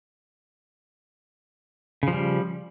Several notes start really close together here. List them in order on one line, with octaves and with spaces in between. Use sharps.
C#3 F3 G3